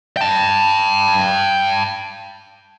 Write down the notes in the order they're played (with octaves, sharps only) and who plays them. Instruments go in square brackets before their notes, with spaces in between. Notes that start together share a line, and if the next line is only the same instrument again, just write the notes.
[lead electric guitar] G5 A5